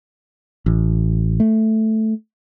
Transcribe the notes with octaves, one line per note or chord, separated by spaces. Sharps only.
A1
A3